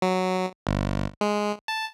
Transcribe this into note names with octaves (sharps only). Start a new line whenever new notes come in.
F#3
G1
G#3
A5